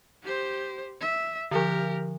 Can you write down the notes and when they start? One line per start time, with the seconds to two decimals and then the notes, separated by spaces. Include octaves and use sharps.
0.23 G4 C5
1.01 E5
1.51 D3 F3 G4 A#4